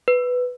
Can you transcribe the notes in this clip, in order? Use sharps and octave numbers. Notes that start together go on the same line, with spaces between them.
B4